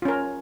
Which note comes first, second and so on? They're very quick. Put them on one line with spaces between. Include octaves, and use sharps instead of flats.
F4 C#4 A#4